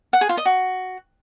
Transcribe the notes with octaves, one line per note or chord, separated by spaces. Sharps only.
F#5
G#4
F4
D#5
F#4